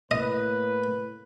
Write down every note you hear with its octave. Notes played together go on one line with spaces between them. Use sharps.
A2 A#3 B4 D#5